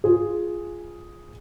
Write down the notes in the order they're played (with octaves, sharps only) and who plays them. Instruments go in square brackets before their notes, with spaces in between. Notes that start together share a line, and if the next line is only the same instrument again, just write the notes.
[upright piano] F4 G#4